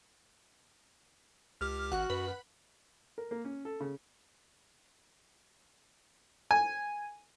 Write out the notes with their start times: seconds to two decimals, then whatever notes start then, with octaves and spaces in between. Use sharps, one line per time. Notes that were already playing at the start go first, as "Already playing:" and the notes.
1.61 C#2 G4 D6 F6
1.92 G#1 F#4 F#5
2.10 F#2 B4
3.18 A#4
3.31 A#3
3.45 C#4
3.65 A4
3.80 C#3
6.51 G#5